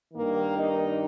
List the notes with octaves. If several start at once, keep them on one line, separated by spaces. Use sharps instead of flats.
G2 D#3 A#3
D#4